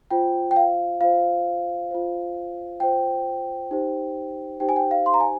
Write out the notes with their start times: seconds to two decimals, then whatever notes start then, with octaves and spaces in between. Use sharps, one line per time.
0.11 F4 C5 G5
0.51 G5
0.56 F5
1.01 F4 C5 F5
1.91 F4 C5
2.80 F4 C5 G5
3.71 D#4 G4 C5
4.60 D#4 G4 C5 G5
4.69 G#5
4.76 G5
4.91 F5
5.06 C6
5.14 A#5
5.20 G#5